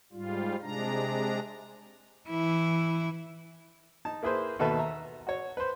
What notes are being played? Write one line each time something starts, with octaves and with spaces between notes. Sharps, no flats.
G#2 G3 F4
C3 G#3 D4 A#5
E3 E4
D#4 A5
A#3 E4 G#4 B4 C5
D#2 B2 A4 B4 E5
E5 A#5
F#4 C#5
B4 C5